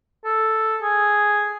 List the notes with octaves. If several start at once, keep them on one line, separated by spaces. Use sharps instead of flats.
A4
G#4